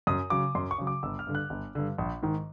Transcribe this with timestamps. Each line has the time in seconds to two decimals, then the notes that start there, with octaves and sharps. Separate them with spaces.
0.07 F#2 D#6
0.30 C#3 F#3 D6
0.55 F#2 C6
0.71 C#6
0.78 C#3 F#3
0.87 D6
1.03 G1 E6
1.19 F6
1.27 G2 D3
1.35 F#6
1.50 G1
1.75 G2 D3
1.98 A#1
2.23 G#2 D#3